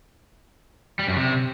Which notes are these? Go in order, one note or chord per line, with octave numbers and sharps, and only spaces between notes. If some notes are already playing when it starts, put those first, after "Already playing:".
G3
F#2
C3